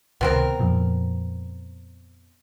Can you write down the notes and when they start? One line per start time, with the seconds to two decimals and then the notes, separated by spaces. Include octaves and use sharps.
0.21 C#2 C3 D#3 B3 C4 A#4
0.59 F2 A#2 F3